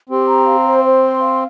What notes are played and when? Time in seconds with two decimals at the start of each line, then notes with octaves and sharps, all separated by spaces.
0.09 C4 G4
0.28 A#5
0.47 F5
0.66 C5
0.84 C5
1.03 C6
1.21 F5